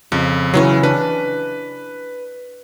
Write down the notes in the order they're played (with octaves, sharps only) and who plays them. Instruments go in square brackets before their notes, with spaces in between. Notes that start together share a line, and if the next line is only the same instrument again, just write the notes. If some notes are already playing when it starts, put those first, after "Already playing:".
[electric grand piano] F2 [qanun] C#3
[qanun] C#3 E3 C#4 [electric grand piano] F#3
[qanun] D4 [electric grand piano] B4